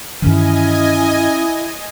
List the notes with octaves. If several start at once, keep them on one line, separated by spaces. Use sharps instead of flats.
G2 D#3 E3 C#4 E4 D#5 G#5